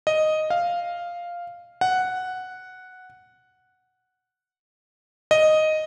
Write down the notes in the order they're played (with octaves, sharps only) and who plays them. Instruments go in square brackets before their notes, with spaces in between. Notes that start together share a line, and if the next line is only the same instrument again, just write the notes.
[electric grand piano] D#5
F5
F#5
D#5